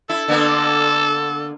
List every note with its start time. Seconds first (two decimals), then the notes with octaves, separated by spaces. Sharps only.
0.09 E4 A4
0.28 D3 A#3 B3